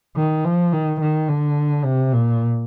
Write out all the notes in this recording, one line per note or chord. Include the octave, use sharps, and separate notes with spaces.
D#3
F3
D#3
D#3
D3
C3
A#2